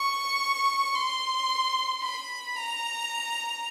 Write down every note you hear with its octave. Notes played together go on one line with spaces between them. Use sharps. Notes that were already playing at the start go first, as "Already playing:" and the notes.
Already playing: C#6
C6
B5
A#5